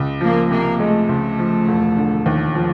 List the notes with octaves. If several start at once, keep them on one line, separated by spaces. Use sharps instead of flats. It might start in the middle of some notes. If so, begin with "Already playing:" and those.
Already playing: C#2
F3 A#3
C3 A#3
G#3 A3
C#2
F3
E1
D3
D#2
F3